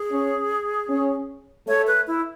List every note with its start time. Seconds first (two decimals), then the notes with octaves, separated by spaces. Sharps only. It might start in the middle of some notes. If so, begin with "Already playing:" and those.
Already playing: G#4
0.10 C#4
0.89 C#4
1.68 A3 C#5
1.87 B4
2.07 E4